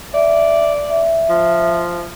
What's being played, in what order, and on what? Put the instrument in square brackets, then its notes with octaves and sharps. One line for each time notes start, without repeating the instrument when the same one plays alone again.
[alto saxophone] D5 [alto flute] E5
[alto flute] E5
[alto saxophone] F3